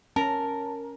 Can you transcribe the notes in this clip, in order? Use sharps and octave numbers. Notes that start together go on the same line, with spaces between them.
C#4 A#4 A5